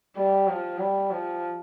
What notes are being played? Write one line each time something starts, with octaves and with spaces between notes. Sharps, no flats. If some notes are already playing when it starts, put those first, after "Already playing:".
G3
F3
G3
F3